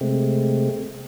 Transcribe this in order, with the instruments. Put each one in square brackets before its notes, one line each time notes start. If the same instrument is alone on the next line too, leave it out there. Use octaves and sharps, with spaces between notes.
[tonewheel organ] C3 G#3 A3 C4